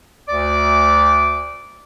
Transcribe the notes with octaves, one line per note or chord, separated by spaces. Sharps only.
D2 D5 D6